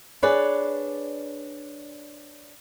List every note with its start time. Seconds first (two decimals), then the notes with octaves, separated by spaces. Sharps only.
0.22 D4 G#4 B4 C#5 D5